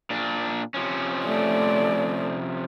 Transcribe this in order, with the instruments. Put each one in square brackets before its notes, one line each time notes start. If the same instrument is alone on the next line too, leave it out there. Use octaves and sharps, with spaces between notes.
[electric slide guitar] A#2 D4
C3 F3 C#4
[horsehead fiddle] A3 D5